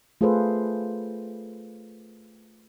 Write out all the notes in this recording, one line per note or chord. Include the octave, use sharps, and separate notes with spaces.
A3 F4 G#4 A4 B4 C5